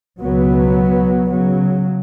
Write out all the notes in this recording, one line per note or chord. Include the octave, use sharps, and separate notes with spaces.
C#2 B2 F#3 B3
C#3 F#3